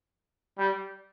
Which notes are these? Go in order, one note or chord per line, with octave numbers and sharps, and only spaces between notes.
G3